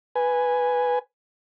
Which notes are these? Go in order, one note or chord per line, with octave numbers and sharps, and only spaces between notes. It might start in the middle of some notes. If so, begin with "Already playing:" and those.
B4 G#5